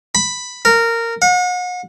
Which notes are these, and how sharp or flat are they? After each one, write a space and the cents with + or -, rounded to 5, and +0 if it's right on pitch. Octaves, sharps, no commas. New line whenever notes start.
B5 +5
A#4 -15
F#5 -40